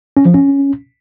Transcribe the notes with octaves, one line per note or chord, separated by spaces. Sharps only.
C#4
F3
C#4